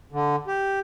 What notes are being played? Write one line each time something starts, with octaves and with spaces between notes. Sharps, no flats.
D3
G4